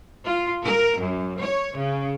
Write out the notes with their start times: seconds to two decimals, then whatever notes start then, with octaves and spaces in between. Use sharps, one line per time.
0.23 F4
0.64 A#4
1.00 F#2
1.40 C#5
1.77 C#3